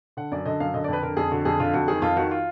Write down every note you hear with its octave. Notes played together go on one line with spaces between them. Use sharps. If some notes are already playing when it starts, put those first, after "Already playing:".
D3 F#5
F#2 D5
D3 D#5
F#2 F5
D3 D#5
D5
F2 B4
D3 A#4
F2 G#4
D3 F#4
F2 G#4
D3 F4
F2 F#4
D#3 G#4
F2 F4
D#3 F#4
F4